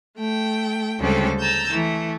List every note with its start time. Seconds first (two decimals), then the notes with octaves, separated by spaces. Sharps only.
0.17 A3 G5
1.00 D2 C#3 G3 G#3 C4 A4
1.40 A5 A#5 E6 G6
1.72 E3 A3